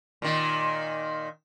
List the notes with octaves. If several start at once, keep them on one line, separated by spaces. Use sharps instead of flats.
A#2 D#3